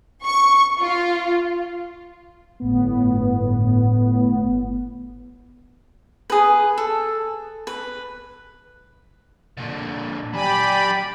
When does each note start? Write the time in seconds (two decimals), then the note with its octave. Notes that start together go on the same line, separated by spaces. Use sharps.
0.24 C#6
0.81 F4
2.60 G1 A2 B3
6.30 G#4 B4
6.78 A4
7.67 B4
9.58 A#2 D3
10.33 F#3 G4 D5 G#5 B5